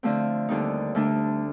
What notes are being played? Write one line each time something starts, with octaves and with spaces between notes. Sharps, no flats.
D3 F3 A3 C4
D#2 D3 G3 C4 D#4
D2 D3 A3 D4